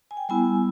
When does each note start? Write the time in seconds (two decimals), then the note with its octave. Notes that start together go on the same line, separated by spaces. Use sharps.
0.11 G#5
0.17 G5
0.29 G3 B3 E4 G#5